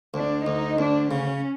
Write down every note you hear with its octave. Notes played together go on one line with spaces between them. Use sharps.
D2 D4
D2 D#4
D2 D4
C#3 C#4